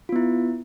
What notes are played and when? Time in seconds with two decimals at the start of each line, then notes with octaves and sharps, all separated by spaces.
0.09 F4
0.12 B3
0.16 E4